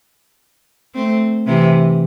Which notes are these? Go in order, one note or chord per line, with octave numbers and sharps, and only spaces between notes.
A3 C4
C3 E3